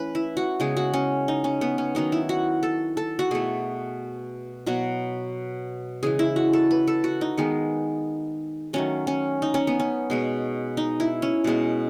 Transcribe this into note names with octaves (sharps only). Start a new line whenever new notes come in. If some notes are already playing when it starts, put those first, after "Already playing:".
Already playing: E3 A3 C#4 B4
E4
F#4
C#3 G#3 B3 G#4
F#4
C#4
D#4
C#4
B3
C#4
D#3 F#3 B3 D#4
E4
F#4
A4
A4
F#4
B2 A3 G#4
B2 F#3 B3 F#4
C#3 E3 G#3 G#4
E4
F#4
A4
B4
A4
F#4
D#4
D#3 G#3 B3
D#3 F#3 A3 C#4
C#4
D#4
C#4
B3
C#4
B2 G#3 B3
D#4
E4
C#4
B2 G#3 B3